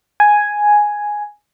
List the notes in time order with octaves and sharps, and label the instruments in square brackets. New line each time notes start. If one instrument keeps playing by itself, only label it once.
[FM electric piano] G#5